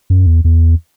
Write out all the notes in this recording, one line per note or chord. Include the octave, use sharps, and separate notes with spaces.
F#2
E2
E2